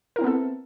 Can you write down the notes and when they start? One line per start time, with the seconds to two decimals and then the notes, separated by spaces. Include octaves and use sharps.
0.16 A#4
0.19 E4
0.21 C4
0.24 B3
0.27 A4